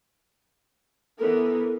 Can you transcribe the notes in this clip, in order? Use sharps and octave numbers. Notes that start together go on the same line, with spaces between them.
E3 B3 A4 A#4